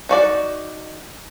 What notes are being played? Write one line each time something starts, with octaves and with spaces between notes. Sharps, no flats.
D#4 F#4 D5